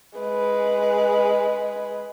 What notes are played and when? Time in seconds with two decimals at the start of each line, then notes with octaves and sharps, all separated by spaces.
0.19 G#3 B4